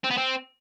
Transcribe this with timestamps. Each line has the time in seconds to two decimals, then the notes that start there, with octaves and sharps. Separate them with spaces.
0.04 C4
0.11 B3
0.17 C4